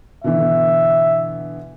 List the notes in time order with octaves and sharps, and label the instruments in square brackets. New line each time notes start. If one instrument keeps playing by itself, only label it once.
[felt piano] B2 D3 E3 [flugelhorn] E5